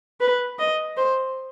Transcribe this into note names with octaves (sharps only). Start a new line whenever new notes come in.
B4
D#5
C5